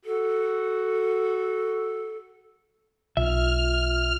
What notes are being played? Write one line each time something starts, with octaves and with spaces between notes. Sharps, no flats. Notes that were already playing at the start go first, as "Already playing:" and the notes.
F#4 A4
B1 F4 E5 F6